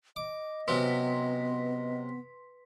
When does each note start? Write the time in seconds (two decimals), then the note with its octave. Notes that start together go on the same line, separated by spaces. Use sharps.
0.16 D#5 D6
0.68 C3 F#3 B3 C#4 B4 C6 B6